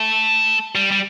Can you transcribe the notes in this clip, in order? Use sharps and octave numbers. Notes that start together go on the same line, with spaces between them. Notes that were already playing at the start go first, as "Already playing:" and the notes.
Already playing: A3
G3
G3